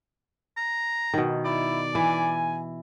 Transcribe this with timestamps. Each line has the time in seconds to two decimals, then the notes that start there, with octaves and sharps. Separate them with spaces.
0.57 A#5
1.14 B2 D#3
1.45 E4 D5
1.95 E3 G#5